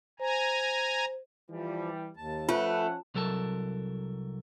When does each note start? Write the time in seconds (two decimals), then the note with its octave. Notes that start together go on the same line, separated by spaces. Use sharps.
0.20 C5 G#5 A#5
1.50 E3 F3 G3
2.17 D#2 A5
2.49 F3 A3 C#4 F4 B4 F#5
3.15 C2 F#3 A4 A#4 A5